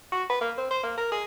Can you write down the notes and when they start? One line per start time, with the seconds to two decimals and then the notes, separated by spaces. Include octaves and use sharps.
0.12 F#4
0.29 B4
0.41 A#3
0.58 C4
0.70 C5
0.83 A#3
0.97 A#4
1.12 G#4